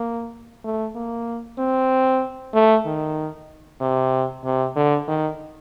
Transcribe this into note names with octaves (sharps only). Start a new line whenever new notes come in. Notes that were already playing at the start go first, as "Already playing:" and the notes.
Already playing: A#3
A3
A#3
C4
A3
D#3
C3
C3
D3
D#3